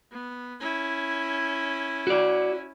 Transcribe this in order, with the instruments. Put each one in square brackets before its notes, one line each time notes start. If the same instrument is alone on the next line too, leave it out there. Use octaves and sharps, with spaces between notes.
[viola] B3
C#4 E4
[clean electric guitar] F#4 D5